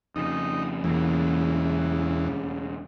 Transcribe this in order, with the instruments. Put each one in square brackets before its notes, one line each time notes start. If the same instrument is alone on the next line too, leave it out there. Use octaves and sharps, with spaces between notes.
[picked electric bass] F2 C#3 [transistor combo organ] D#4
[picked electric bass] E1 A#3 [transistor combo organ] E2 [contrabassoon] C#3